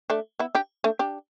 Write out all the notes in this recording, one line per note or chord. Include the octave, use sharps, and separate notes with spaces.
A3 D4
B3 E4
D4 G4
A3 D4
D4 G4